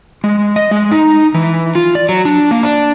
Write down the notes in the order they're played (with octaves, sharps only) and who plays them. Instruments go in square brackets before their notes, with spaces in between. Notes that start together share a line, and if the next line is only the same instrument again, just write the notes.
[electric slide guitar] G#3
D#5
G#3
D#4
E3
F4
D5
F#3
D4
A#3
D4